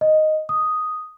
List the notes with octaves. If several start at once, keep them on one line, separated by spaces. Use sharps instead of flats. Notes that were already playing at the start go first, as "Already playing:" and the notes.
D#5
D#6